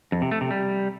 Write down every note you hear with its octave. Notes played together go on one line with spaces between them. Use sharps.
F2
C3
A3
C3
G3